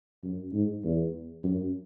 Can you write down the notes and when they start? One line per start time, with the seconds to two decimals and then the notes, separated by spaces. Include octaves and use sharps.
0.23 F#2
0.54 G#2
0.84 E2
1.44 F#2